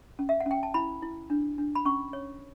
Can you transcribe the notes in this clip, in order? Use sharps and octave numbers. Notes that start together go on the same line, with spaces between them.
C#4
E5
F#5
C#4 G5
A5
E4 B5
E4
D4
D4
B5
C#4 C#6
C#5